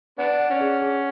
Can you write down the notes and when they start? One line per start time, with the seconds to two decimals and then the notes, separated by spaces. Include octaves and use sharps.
0.18 B3 D4 F#5
0.39 F#5
0.50 C#4
0.61 G#4
0.81 G#4